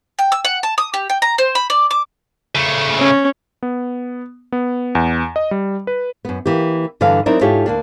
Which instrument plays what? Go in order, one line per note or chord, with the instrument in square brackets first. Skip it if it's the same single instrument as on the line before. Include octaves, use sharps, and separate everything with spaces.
[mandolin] G5
E6
F#5
A5
D#6
G4
G5
A#5
C5
B5
D5
D6
[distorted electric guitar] C#3 A3
[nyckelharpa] C#4
[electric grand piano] B3
B3
E2
D#5
G3
B4
[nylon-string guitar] F#2 B3
E3 A#3 G4
G2 D3 E3 B4 F5
F#3 C4 D#4 E4 A#4 D5
G#2 E4 F4 G4 A4 C#5
D2 A#3 D4